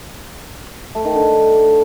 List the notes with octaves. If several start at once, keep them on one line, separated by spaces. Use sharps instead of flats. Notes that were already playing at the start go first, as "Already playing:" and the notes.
A3
D#3
D3